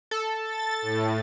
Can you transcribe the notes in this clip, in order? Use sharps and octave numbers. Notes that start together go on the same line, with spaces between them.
A4
A6
A2